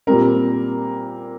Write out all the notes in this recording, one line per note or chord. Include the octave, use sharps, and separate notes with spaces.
A#2 G3 C4 A#4